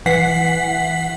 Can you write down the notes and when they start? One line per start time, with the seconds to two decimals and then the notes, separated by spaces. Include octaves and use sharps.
0.06 E3 F#5 B6 C7